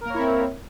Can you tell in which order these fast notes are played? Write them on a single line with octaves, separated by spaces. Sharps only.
A#4 A#3 C#5 E4 C4